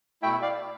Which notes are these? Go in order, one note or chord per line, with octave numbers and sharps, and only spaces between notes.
B2 A3 E4 E5 G5
D5 F5